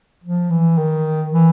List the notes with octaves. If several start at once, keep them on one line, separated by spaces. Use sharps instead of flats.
F3
E3
D#3
E3